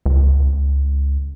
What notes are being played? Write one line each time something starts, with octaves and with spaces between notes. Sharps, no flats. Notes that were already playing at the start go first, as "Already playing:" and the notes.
C#2